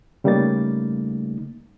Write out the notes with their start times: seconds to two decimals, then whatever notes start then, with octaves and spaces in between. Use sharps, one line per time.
0.24 C#3 G3 A3 A#3 D#4 A6